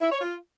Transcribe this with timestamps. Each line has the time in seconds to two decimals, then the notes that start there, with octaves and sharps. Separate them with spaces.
0.01 E4
0.11 C#5
0.21 F4